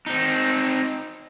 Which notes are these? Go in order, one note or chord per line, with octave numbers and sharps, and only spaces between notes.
C4 D#4